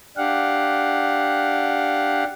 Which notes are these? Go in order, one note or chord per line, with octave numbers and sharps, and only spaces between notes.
D4 G4 F5 F#5